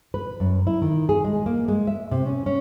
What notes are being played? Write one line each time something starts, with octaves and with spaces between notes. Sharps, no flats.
B4
F#2
E4
D#3
G#4
G#3
A#3
G#3
E5
C3
C#4
C#4